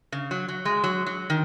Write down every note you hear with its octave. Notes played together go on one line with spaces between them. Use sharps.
C#3
F#3
F#3
G#3
F#3
F#3
D#3